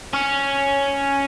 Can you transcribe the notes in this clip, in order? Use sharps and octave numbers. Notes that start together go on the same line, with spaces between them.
C#4